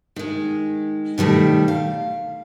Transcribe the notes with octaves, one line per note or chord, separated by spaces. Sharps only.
D#3 G#3
B2 D#3 G3 A3
F5